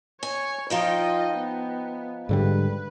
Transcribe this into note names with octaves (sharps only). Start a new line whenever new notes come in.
C#5 G#5
F3 D#4 F4 D#5 G5
B3
G#2 D3 G3 B4